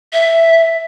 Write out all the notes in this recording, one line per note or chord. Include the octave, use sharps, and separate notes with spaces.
E5